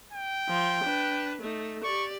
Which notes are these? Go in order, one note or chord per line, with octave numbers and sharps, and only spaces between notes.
G5
F3 C6
D4 B4
A3 D#4
G4 D5 C#6